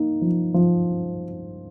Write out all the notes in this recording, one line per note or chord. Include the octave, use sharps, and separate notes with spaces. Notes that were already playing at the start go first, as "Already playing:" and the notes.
Already playing: A#3 D#4
F3
F3